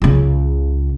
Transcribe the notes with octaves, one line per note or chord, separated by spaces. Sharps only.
C#2 C#3